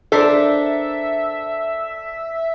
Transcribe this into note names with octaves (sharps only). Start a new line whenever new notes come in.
D4 A4 A#4 C5 E5